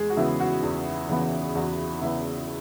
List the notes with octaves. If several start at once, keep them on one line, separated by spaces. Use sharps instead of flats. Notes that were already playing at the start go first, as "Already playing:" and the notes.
Already playing: E2 G#3 G#4
F#4
C#3 E3 B3 E4
F#4
E2
C#3 E3 B3
E2 F#4
C#3 E3 B3 E4